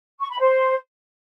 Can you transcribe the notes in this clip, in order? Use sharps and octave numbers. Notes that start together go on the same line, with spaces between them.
C#6
B5
C5